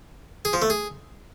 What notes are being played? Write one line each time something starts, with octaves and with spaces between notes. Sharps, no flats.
G#4
F3
A3
G#4